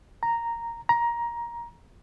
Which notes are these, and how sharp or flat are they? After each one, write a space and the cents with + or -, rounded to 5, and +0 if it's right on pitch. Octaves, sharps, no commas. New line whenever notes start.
A#5 -5
A#5 +15